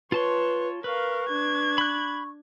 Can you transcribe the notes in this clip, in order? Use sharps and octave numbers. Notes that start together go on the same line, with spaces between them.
F4 B4 C#5 A5 C6
A#4 B4 F5 C#6
D4 G#6
B5 F#6